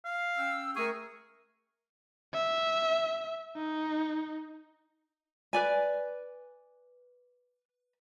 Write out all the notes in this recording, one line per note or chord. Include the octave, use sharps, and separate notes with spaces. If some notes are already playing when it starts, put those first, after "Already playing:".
F5
C#4 G5 E6
A3 G#4 A#4 C#6
E5
D#4
B4 D5 G#5